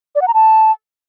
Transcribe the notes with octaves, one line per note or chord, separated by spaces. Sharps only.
D5
F#5
A#5
A5